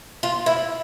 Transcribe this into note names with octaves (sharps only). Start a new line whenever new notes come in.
F4
E4